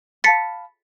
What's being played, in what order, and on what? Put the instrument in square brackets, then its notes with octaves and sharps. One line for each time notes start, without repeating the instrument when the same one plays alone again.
[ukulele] F5 A5 B5 [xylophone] A6 B6 C#7